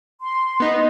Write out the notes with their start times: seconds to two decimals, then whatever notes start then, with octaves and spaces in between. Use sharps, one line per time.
0.21 C6
0.60 B3 D#4